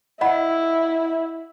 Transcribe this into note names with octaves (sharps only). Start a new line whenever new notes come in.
E4 D#5 F#5 B5